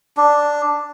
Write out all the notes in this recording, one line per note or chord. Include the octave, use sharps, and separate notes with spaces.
D4